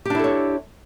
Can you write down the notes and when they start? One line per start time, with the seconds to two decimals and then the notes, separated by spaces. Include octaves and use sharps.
0.05 G4
0.10 D4
0.15 E4
0.19 A4
0.24 C#5